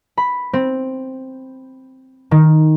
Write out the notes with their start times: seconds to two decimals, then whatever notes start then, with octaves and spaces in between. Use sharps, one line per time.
0.18 B5
0.53 C4
2.31 D#3